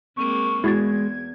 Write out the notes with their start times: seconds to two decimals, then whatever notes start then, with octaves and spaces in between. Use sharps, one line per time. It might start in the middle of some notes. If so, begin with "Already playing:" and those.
0.17 G#3 A#3 C4 C#6
0.64 E2 G#3 E4 F#4 G#6 A6